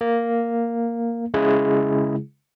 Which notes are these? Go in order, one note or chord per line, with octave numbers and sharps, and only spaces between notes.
A#3
C#3 G#3 E4 G#4